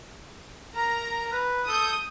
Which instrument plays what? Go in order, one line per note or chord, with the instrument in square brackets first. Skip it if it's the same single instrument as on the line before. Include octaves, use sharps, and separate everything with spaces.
[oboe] A#4 [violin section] A#5
[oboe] B4
[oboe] A4 [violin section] D#6 G6